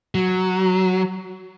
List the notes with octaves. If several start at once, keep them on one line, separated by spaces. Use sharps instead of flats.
F#3